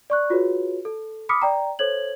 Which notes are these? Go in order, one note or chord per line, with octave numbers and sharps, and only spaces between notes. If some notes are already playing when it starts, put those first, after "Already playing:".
D5 C#6 F#6
F4 F#4 G#4 B4 C#5
A4
B5 D6 D#6 F6 B6 C#7
D5 G5 A#5
A4 C5 C#5 G#6 F#7